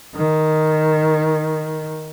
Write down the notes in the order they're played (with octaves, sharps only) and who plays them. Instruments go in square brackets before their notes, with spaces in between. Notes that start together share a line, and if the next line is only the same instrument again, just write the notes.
[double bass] D#3